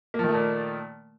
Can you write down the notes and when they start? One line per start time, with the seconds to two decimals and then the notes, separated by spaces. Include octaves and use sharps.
0.14 A#3
0.19 F3
0.24 D#3
0.29 A3
0.34 A#2